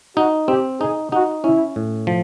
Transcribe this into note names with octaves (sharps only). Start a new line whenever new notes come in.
D#4 F#4
C4 G4
D#4 G#4
D#4 F#4
C#4 E4
A2
F3